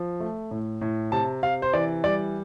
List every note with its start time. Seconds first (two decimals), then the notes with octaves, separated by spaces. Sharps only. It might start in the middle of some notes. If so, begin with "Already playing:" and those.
Already playing: F3
0.20 A3
0.51 A2
0.81 A2
1.12 C3 A5
1.43 C3 F5
1.62 C5
1.73 E3 D5
2.04 G3 D5